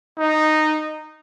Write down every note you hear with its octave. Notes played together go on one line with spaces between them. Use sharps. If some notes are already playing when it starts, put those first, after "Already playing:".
D#4